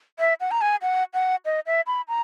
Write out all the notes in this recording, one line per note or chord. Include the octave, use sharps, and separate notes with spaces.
E5
F#5
A#5
G#5
F#5
F#5
D#5
E5
B5
A#5